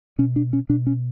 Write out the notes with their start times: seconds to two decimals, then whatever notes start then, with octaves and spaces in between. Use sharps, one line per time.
0.18 B2 C#4
0.36 D4
0.53 C#4
0.69 B2 D4
0.87 C#4